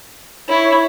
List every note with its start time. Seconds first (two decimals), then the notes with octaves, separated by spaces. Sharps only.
0.49 E4 C#5